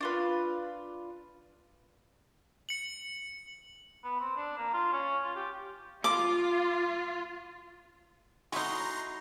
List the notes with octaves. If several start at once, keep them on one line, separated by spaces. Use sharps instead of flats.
D4 F4 B4
C#7 F#7
B3
C4
D4
A#3
F4
C#4
F4
G4
F4 D6
G#3 A3 D#4 E4 F#4 A#5 C6